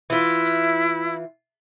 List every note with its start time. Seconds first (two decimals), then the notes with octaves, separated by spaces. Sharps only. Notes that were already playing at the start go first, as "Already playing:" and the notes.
0.10 E3 E4 F4